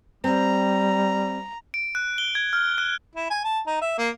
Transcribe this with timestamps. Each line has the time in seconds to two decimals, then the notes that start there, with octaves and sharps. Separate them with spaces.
0.24 G3 C4 A#5
1.74 D7
1.95 F#6
2.18 G7
2.35 G#6
2.53 F6
2.78 F#6
3.15 E4
3.30 G#5
3.44 A5
3.67 D#4
3.81 E5
3.98 A#3